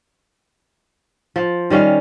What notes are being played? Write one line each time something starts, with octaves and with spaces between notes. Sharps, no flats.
F3
D#3 G3 C#4 F5